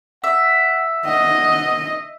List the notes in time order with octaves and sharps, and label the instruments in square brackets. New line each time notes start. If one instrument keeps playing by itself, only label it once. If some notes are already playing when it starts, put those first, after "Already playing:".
[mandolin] E5 [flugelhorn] F#5
[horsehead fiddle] D#5 [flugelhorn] F#5